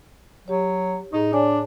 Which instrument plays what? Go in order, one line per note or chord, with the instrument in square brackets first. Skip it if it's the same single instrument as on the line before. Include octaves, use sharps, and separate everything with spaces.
[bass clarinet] F#3 [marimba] G4 C#5
[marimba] A2 G#4 A#5 [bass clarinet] D#4
[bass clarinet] D4 [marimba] C#5 D5 G#5